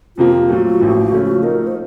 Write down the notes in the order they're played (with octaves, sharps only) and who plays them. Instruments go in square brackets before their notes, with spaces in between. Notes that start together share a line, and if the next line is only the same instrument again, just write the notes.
[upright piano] F2 C3 F3 A#3 [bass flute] F4
[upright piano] A#2 F#3 A3 [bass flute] F#4
[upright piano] A1 A2 F3
C#2 C#3 F3 A3 C#4
[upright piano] A#2 A3 D#4 [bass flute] A#4
[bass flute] C5